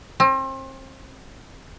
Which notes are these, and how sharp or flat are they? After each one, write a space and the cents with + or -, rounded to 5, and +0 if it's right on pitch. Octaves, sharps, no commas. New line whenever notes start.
C4 +35